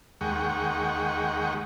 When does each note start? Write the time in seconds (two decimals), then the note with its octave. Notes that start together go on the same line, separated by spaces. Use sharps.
0.21 D#2 G#3 F#5 G5 C#6